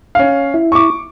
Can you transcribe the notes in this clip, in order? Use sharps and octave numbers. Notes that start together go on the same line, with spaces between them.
C#4 F5
E4
C#6 D6